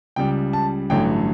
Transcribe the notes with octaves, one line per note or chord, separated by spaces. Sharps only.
C#2 C#3 G3 G5
A5
A1 G2 D3 F#3 A3 G5